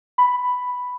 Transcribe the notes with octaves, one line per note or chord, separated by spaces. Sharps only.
B5